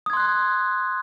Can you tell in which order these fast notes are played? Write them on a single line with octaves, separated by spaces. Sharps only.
D#6 G#6 C6 F#6